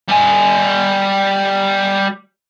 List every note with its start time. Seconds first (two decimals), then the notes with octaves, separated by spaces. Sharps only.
0.08 G3 G#5